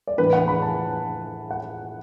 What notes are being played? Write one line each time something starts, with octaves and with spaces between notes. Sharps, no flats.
D5
A2 E3 B3 D4 B4
F#5
B5
A5
F#5